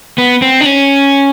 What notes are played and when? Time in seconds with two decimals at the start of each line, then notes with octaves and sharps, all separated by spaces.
0.18 B3
0.42 C4
0.61 D4
0.66 C#4